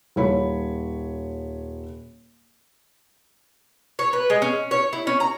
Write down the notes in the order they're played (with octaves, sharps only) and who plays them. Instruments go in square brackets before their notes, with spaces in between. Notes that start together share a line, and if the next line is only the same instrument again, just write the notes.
[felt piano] D#1 C#5 B5
[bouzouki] C#5
B4
G#3
C#4
C#5
E4
C#4
A#5